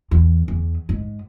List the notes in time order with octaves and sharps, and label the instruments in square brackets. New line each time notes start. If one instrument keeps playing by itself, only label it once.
[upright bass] E2
E2
G#2